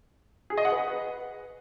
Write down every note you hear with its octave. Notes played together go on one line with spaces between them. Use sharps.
G#4
D#5
F#5
B4